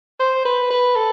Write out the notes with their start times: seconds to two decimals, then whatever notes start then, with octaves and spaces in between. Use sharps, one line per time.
0.20 C5
0.45 B4
0.71 B4
0.96 A4